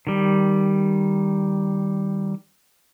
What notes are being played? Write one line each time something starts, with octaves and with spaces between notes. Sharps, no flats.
D#3 G3